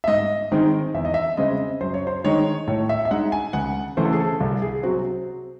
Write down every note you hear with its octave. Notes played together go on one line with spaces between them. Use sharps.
E5
G#2 D#5
D#3 G#3 C4 D#4
E2 E5
D#5
E5
C#3 G#3 C4 D#5
F#2 C5
C#5
C5
D#3 G#3 D#4 C#5
A2 C#5
E5
E5
G#3 D#4 F#5
G#5
C#2 F#5
C#3 E3 A3 C5
A4
G#4
A4
C2
G#4
C3 F#3 C4 F#4